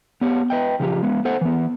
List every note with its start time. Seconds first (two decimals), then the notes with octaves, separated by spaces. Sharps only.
0.21 B3 G4 C#5
0.50 B4 D#5 G5
0.80 C#3 F3 G4
1.03 G#3 B3
1.25 A4 C5 F#5
1.41 E3 B3